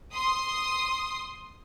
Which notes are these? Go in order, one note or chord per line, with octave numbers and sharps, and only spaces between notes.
C6 D#6